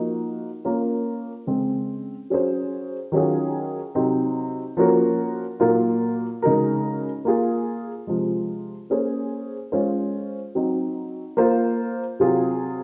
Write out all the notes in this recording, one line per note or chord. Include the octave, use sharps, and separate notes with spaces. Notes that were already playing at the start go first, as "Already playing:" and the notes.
Already playing: F3 A#3 D#4 F#4
A#3 C#4 F4 A#4
C#3 G#3 C4
F#3 C#4 G#4 C5
D#3 F#3 C#4 F4 G#4
C3 F#3 C4 D#4
F3 A#3 C#4 F#4 A#4
A#2 F#3 A#3 F4
C#3 G#3 D#4 F#4 A#4
A#3 F4 G#4
C3 F3 G#3
A#3 C#4 G#4 C5
G#3 C#4 F4 C5
F#3 C4 D#4
A#3 F4 C5
C3 F#3 C4 F4 G#4